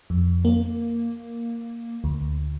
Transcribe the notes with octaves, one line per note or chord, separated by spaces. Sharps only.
F2
A#3
D2